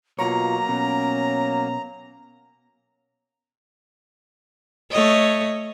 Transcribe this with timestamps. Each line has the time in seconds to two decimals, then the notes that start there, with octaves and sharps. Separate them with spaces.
0.19 B2 F#3 A#3 F4 C#5 A#5
0.69 B2 C#4
4.90 A3 C#5 D#5